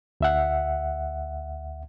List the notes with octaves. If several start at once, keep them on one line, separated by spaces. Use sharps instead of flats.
D2 E5 F#5